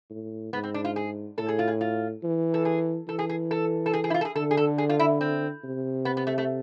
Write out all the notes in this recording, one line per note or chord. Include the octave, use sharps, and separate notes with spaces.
A2
G#2 B3
C4
D4
F4
G#4
A2 A4
G#4
F4
G#4
F4
E3
A4
G#4
E3 A4
G#4
G#4
A4
A4
G#4
G#4
E4
F4
A4
G#4
D3 A4
G#4
A4
G#4
F4
E4
C4
C3
B3
B3
A3
A3